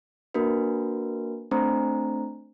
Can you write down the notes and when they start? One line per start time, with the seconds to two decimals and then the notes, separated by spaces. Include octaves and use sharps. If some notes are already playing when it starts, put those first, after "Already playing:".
0.34 A#3 D4 F#4 A#4 B4
1.51 A3 C4 D4 C5 A#5